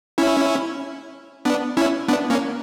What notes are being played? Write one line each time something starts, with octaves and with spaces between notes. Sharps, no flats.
C#4 E4
B3 D4
C#4 E4
B3 D4
A#3 C#4